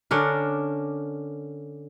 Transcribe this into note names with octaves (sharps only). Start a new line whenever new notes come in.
D3 C#4 D4 A#4